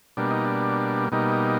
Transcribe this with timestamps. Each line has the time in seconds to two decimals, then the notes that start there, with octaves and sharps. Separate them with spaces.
0.17 B2 G3 A#3 D4
0.31 D#4
0.45 D4
1.12 B2 G3 A#3 D#4